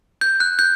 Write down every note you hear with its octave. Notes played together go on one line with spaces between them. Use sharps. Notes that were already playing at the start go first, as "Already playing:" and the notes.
G6
F#6
G6